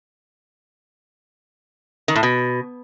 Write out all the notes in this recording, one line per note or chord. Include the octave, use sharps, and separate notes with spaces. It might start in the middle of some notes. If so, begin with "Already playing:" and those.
D#3
A2
B2